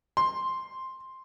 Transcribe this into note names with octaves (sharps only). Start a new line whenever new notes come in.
C6